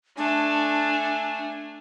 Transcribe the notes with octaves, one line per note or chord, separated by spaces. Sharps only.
A3 D4 G#5